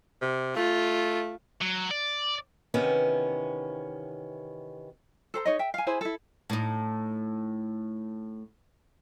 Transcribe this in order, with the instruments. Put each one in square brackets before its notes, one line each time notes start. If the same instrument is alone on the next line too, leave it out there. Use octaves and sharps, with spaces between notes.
[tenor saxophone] C3
[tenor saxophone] A3 [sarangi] F4
[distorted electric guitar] F#3
D5
[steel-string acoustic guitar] C3 D#3 E3 B3 C#4
[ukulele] A4 C5 A#5
D#4 C#5 D#5
E5 G5
F5 G#5
E4 G#4 C5 G#5
E4 A4
[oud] A2 D#4